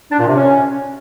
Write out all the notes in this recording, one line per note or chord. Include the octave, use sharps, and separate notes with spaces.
D4
A#2
C3
C#4